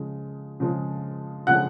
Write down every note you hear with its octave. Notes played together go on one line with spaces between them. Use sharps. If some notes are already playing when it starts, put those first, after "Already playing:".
Already playing: C#3 F3 G#3
C#3 F3 G#3
C#3 F3 G#3 F#5 F#6